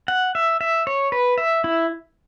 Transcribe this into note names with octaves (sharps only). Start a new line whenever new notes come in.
F#5
E5
E5
C#5
B4
E5
E4